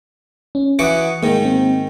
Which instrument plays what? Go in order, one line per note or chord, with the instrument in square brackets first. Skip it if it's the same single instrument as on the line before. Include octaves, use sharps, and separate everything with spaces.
[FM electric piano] C#4
[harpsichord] E3 F#4 D6 [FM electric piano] F#5 D#6 C#7
[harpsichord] G#2 D#3 [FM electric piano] A#3
[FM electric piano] A#3 C4